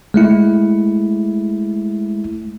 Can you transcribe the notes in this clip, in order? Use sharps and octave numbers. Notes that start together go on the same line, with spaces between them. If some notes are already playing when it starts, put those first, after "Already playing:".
G#3 A3 E4